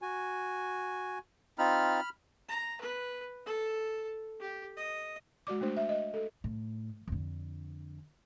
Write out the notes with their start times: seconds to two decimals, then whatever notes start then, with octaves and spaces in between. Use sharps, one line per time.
0.02 F#4 G#5
1.58 C4 D#4 F4 B5 F6
2.48 A#5
2.81 B4
3.46 A4
4.41 G4
4.77 D#5
5.47 G#3 F#4 D5 D6
5.61 A3 D4 C5
5.77 E5
5.89 D#5
6.14 A4
6.44 A2
7.07 F2 D3